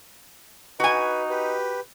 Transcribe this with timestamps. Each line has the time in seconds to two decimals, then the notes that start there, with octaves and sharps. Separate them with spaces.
0.80 D#4 F#4 B4 G#5
1.30 G4 B4